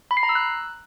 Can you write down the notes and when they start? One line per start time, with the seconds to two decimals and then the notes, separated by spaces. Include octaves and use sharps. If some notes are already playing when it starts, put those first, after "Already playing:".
0.11 B5
0.17 C7
0.23 A#5
0.29 E6
0.35 F#6